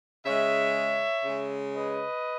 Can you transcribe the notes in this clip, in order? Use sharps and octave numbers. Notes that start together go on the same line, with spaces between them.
C#3 G#3 C#5 E5
C#3 G#3
B4 D#5